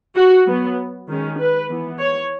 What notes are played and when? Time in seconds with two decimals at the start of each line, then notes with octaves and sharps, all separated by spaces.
0.15 F#4
0.47 F#3 B3
1.08 D#3 G#3 C#4
1.39 B4
1.69 E3 B3
1.99 C#5